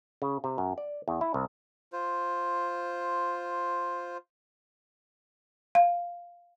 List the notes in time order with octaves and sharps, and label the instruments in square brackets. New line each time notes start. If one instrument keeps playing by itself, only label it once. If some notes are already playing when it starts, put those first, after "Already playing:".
[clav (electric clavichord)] C#3
C3
F#2
D5
E2
E4
C2
[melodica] F4 C5
[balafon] F5